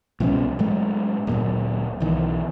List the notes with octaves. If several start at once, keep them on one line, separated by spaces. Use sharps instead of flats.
C2 B2 F3 C#4
A2 F#3 G#3 A3
D1 A#2 F#3
B1 D#3 E3